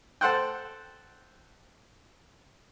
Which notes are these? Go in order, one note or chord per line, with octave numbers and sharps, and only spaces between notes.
A4 C5 F#5 G5